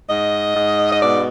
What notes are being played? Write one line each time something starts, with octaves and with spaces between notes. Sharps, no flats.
G#2 D#5
G#2
D#5
B2 D5